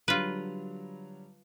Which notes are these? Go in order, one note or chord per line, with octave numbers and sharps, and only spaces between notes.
D3 F#3 G3 F4 B4